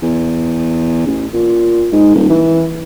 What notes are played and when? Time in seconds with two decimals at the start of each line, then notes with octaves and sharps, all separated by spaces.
0.03 E2
1.07 A1
1.34 A#2
1.93 G#2
2.15 D#1
2.30 E3